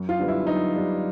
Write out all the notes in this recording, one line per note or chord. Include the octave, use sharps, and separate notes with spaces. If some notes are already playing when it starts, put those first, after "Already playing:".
Already playing: F#2
F4
D3 G3 B3
E4
F#2 D#4
D3 G3 B3 D4